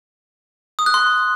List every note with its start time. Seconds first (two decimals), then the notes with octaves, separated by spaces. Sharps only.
0.79 D#6
0.86 F#6
0.94 C6